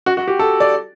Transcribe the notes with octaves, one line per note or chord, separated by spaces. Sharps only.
F#4
F#4
G4
A4
D5